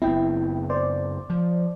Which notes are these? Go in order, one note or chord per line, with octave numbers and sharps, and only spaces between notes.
F#1 B3 C4 E4 G5
C5 D5
F3